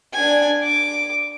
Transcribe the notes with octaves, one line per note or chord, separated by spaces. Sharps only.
D4 G#5
D6